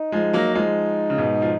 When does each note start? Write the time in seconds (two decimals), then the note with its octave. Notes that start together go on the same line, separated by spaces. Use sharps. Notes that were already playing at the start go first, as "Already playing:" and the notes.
Already playing: D#4
0.12 F3 G#3
0.33 F#3 A#3
0.55 F3 G#3 D#4
1.10 C#3
1.18 G#2 B2
1.42 F3